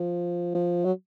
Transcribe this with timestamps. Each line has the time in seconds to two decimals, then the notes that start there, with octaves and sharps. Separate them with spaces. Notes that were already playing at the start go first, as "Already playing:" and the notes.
Already playing: F3
0.55 F3
0.85 F#3